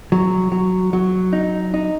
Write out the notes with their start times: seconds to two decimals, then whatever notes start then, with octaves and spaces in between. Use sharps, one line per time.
0.12 F#3
0.52 F#3
0.93 F#3
1.33 D#4
1.74 D#4